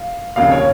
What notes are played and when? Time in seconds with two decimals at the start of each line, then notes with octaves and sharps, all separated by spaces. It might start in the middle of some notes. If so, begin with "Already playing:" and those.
Already playing: F5
0.36 F1 D#2 C#3 F5
0.52 C#5